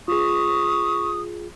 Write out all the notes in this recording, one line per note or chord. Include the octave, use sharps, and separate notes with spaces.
F4 G#4 C#6 D#6